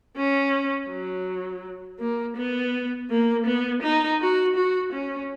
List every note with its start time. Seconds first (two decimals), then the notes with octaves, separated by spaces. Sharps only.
0.16 C#4
0.90 F#3
2.00 A#3
2.36 B3
3.10 A#3
3.46 B3
3.82 D#4
4.20 F#4
4.56 F#4
4.93 C#4